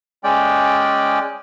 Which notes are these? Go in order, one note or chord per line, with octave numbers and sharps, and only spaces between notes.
G#3 C#4 D5 G5